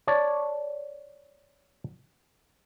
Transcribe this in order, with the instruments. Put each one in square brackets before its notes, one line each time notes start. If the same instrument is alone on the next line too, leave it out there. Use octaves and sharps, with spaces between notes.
[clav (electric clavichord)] C#5 D5 A5